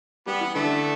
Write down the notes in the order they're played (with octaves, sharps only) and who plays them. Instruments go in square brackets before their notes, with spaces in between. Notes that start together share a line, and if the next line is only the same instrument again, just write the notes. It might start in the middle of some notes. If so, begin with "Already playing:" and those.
[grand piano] G3 G4 [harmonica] B3
[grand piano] E3 E4
[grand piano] D3 D4 [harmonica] A3